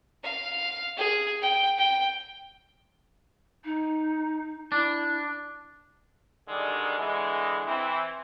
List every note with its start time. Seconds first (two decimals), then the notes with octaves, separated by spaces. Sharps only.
0.24 F5
0.97 G#4
1.42 G5
1.78 G5
3.64 D#4
4.72 D4 E4
6.48 D3 D#3 G3 G#3
6.99 D3 E3 G#3
7.67 E3 C4